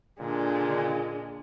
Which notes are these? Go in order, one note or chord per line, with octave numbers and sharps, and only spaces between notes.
A#2 D3 G#3 D4